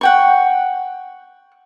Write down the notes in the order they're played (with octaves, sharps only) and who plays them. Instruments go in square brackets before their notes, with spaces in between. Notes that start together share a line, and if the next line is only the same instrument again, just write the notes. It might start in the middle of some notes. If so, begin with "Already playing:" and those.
[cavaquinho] F#5 G5 C#6